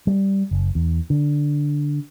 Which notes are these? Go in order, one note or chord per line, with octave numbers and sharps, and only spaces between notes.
G3
F#1
E2
D3